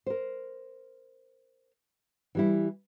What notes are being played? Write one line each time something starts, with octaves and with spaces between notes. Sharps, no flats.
A#4 C5
E3 G3 E4